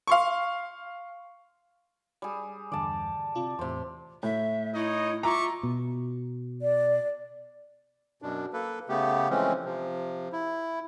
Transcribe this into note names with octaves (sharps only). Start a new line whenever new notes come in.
F5 C6 C#6
G3 G#4
E2 G2 D3 D5 A5
C3 F4 D5
E2 A2 C3 C5
A2 E5
D#4 E4 C#5 D#5
F4 E5 A#5 C#6 D6
B2
D5
F#2 B2 D4
A#3 A4 B4
C#3 A3 B3 G4
E3 F3 G#3 A3 C4 C#4
C3 F3
E4